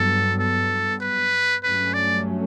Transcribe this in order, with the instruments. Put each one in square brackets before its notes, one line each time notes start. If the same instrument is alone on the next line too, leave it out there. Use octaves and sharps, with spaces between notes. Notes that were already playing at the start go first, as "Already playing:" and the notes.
Already playing: [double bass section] G2 F#3 B3 [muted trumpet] A4
[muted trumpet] A4
B4
[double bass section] G2 F#3 A3 C#4 [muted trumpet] B4
[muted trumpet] D5